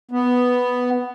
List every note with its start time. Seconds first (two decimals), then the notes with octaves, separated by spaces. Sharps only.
0.11 B3